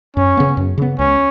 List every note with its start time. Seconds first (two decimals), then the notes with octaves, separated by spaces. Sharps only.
0.16 F#2 C#4
0.37 C#3 B3
0.57 F#2
0.78 C#3 B3
0.99 C#2 C#4